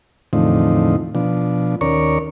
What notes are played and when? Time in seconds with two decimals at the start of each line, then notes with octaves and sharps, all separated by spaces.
0.33 E2 A2 D3 F3 C4 D#4
1.15 B2 F3 D4
1.81 D#2 C#4 A#4 C#5 D5 C#6